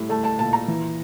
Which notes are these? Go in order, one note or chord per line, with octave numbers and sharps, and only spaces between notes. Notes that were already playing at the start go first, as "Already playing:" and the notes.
Already playing: A2 G3
A3 A5
A5
A#2 A5
A#5
E3